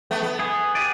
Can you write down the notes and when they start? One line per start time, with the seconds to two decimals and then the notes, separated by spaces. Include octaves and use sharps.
0.11 A3 B3
0.23 B3
0.40 G#4
0.75 G4 G#4 D5